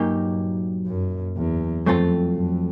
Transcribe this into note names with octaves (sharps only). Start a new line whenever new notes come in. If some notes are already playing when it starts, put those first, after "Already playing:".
Already playing: G2 A#2 F#3 A#3 D#4 G4
F#2
E2
F2 F#3 A3 C4 F4 A4
F2